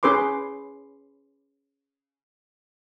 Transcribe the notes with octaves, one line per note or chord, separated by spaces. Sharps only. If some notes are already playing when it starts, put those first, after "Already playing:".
C#4 G#4 B4 C6 D6